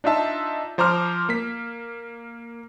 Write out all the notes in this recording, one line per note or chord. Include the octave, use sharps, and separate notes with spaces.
D4 D#4 F4 E5 A5
F3 C5 A#5 D6 F6
A#3 B6